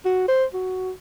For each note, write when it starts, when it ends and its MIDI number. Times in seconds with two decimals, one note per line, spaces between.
0.05 0.27 66
0.28 0.44 72
0.54 0.91 66